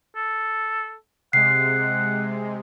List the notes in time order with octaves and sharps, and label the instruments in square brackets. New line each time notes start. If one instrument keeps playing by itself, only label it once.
[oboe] A4
[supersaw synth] C3 G#3 [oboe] F#5 [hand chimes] C7